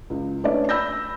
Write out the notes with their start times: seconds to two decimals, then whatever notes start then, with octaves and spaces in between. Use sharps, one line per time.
0.10 C#2
0.44 A3 C#4 D4 B4 C#5 D5
0.69 B5 E6 G6 A#6